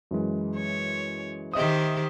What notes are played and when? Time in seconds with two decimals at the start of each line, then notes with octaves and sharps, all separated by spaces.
0.11 F#2 E3 G#3
0.56 C#5
1.54 D#3 G4 C5 D#5 E5 D#6